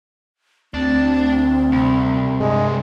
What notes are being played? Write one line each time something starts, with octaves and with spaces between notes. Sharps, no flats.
D2 C4 D4
C2
G2 G#3